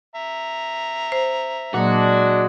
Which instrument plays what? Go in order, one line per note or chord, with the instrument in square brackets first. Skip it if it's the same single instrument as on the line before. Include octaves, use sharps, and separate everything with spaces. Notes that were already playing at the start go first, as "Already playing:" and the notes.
[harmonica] E5 A#5
[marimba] C5
[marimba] A#2 F#3 A#3 [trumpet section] G#3 D4 [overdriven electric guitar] F#4